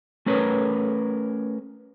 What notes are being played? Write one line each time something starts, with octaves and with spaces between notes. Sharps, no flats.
A3 C#4 A#4 B4 C#5